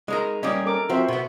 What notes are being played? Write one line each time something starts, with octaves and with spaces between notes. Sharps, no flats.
G#3 D#4 A#4 D#5
G3 A#3 C#4 D#5
A4 A#4 D6
F3 C4 F#4 C5 E5
B2 B3